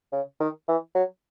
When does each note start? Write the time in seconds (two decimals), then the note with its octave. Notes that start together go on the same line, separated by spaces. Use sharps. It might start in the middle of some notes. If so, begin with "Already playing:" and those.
0.13 C#3
0.40 D#3
0.68 E3
0.95 F#3